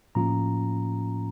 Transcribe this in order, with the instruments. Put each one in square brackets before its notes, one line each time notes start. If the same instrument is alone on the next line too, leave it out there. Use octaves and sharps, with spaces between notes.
[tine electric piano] A2 F3 A#3 C#4 F4 A#5